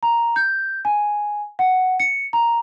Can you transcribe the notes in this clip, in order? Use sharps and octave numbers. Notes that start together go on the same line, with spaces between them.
A#5
G6
G#5
F#5
C#7
A#5